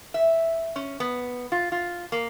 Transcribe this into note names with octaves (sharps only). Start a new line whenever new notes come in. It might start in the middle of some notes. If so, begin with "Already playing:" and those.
E5
C#4
B3
F4
F4
A#3